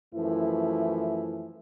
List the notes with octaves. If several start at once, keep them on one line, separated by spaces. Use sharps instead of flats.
F#2 E3 F3 A3 E4